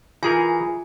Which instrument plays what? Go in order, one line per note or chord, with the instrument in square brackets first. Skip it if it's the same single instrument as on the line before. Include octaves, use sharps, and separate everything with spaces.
[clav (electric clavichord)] E3 G#4 A#4 [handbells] F4 G#5